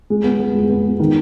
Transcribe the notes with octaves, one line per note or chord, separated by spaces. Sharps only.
G#3
B3
B3
G#3
B3
G#3
D#3